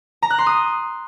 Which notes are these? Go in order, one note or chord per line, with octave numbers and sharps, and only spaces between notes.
A#5
F#6
C6
D#6